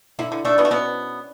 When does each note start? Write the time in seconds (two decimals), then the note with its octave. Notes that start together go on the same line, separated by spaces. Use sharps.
0.19 D3 E4
0.32 D3
0.45 A3 D4
0.58 B2 B3
0.65 A3
0.71 B2 B3 C#4